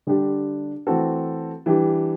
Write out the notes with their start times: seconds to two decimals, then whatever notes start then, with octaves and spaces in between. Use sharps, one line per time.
0.07 D3 G3 D4 G4
0.87 E3 A3 C4 F#4 A4
1.66 E3 G3 D4 G4